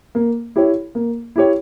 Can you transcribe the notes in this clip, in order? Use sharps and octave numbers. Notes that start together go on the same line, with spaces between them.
A#3
E4 G4 C#5
A#3
E4 G4 C#5